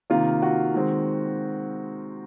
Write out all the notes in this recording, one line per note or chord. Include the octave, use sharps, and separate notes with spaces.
C3 D#3 A#3 F4
F#4
D#3 G#3 C4